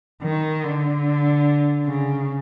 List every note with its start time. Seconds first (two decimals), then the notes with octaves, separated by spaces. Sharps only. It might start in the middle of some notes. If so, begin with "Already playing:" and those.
0.23 D#3
0.63 D3
1.86 C#3